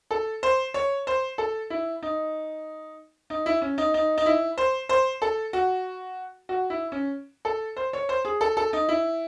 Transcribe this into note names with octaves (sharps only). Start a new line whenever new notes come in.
A4
C5
C#5
C5
A4
E4
D#4
D#4
E4
C#4
D#4
D#4
D#4
E4
C5
C5
A4
F#4
F#4
E4
C#4
A4
C5
C#5
C5
G#4
A4
A4
D#4
E4